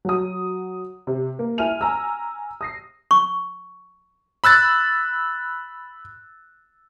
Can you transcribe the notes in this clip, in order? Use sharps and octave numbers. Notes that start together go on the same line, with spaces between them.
F#3 F#4 D#6
C3
A#3
E4 G#5 F6 D#7 F7
G#5 A#5 E6
D#6 A#6 C7
C#6
B5 E6 F#6 A6